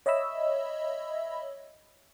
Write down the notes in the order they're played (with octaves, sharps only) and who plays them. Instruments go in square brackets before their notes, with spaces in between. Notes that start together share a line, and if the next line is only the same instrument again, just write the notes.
[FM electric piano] C#5 D#5 E5 B5 E6